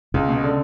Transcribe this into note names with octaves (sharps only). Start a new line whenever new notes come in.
C#2 C#3
B2
D3